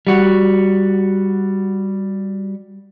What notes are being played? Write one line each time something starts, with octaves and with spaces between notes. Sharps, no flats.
G3 F#4